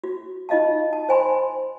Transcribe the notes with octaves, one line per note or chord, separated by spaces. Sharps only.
F#4
D#4 F4 D#5 F5 A5
A5
C5 G#5 B5 C6